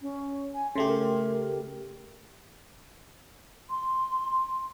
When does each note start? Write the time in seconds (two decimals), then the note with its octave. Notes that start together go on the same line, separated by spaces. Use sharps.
0.02 C#4
0.54 G#5
0.75 C#3 A3 G4 C6
0.88 A#4
3.70 C6